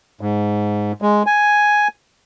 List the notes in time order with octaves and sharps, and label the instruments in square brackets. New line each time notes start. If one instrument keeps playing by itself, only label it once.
[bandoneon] G#2
G#3
G#5